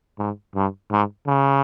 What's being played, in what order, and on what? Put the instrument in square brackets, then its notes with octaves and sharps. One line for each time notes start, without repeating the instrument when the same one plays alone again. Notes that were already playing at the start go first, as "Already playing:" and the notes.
[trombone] G#2
G2
G#2
C#3